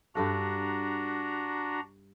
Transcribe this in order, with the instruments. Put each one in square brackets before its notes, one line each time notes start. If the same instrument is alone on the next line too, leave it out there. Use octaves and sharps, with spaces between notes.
[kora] G2 A4 F#5 [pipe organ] D4 F#4 A#5